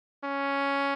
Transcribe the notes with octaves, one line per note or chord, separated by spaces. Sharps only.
C#4